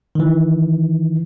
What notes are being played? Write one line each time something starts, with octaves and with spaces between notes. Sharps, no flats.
D#3 E3